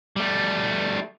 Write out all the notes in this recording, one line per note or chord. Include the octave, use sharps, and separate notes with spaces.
G3 A3